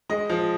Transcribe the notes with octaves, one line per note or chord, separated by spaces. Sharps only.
G#3 D#5
F3